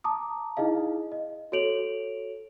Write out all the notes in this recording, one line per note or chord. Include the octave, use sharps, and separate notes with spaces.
A5 A#5 D6 D#6
D#4 E4 G#4 D#5 F5
D#5
F#4 A4 C#5 D7 F7 F#7